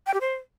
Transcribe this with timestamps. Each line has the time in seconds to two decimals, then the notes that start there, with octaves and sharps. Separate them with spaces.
0.06 G5
0.14 G4
0.21 C5